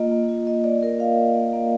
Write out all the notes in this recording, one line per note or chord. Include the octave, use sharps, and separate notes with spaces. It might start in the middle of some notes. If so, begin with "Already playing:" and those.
Already playing: A#3 F4 D#5
A#3
F4
F4 D#5
A#3 D5
A#3 A#4
F4 F5
F4
A#3
A#3